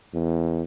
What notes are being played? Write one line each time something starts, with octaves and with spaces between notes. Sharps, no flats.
E2